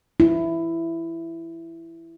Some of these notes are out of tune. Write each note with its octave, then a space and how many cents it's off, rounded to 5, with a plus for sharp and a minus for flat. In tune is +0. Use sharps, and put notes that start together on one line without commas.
E4 +10